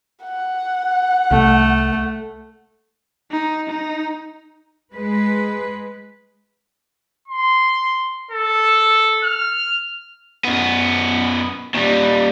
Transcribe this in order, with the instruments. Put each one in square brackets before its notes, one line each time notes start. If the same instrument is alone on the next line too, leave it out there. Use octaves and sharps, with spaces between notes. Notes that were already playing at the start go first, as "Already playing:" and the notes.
[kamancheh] F#5
[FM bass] C2 [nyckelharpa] A3
[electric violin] D#4
D#4
[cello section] G#3 B4
[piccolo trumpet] C6
A4
F6
[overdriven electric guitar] F#2 B3
D#2 G3